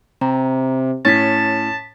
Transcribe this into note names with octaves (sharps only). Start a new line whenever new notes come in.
C3 A#5
A2 C#4 A5 A6 B6